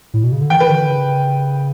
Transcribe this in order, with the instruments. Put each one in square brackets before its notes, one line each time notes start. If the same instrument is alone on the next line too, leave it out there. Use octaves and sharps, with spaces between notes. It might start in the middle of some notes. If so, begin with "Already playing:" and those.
[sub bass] A2
B2
C#3
D3
[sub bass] E3 [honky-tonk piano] G5
[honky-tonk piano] B4
[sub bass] D3
C#3